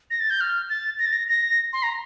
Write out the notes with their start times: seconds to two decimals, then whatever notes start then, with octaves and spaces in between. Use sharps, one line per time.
0.11 A#6
0.20 A6
0.30 G6
0.41 F6
0.69 A6
0.99 A#6
1.06 A6
1.13 A#6
1.29 A#6
1.73 C6
1.83 A#5